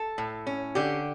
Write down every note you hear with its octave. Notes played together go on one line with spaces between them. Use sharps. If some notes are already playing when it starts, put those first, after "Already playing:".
Already playing: A4
A2
C#4
D3 G4